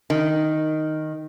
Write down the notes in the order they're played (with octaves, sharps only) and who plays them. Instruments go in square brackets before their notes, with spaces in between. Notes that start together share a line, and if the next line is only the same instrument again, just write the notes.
[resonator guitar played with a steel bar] D#3